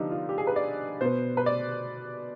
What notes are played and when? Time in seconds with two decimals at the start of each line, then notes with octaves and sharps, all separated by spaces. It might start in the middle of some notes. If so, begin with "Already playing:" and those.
Already playing: D3 F3 B3 D4 D#4 G4
0.11 F4
0.29 G4
0.38 G#4
0.47 B4
0.56 D5
1.01 B2 B3 C5
1.37 B4
1.46 D5